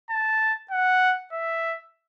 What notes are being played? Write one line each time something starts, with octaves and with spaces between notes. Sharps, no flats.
A5
F#5
E5